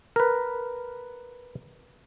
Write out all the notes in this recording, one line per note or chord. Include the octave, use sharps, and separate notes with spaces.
A#4 B4